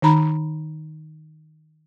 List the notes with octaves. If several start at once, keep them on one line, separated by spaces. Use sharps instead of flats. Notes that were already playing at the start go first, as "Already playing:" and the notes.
D#3 D#4 A#5 B5